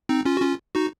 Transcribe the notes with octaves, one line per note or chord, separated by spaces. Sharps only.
C4 D#4
C#4 F4
F#4
C#4 F4
D#4 F#4